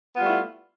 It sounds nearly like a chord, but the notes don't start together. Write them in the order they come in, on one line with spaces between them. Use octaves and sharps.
B3 F4 G3 A3 E4